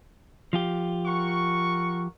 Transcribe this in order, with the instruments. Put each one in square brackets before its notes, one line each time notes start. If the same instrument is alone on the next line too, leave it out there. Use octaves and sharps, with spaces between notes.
[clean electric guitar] F3 F4 G4
[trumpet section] A#4 F#5 C#6